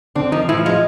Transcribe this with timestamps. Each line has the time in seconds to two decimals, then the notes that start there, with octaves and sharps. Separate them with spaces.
0.15 D3 C4 D4
0.32 D#3 F3 D#4
0.49 A2 E3 E4
0.65 F3 G#3 F4